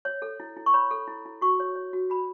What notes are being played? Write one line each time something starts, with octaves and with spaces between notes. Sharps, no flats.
C#5
A4
E4
E4
C#6
C#5 B5
A4
E4
E4
F#4 C#6
C#5
C#5
F#4
F#4 B5